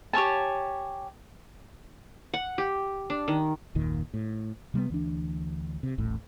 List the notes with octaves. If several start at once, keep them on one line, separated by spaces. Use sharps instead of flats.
G4 C#5 G#5 A5
F#5
G4
D4
D#3
F#1 D#2 A#2 D#3
A2
C3 G3 A3 B3
D2 E3 D4
C3
D#1 A1 A2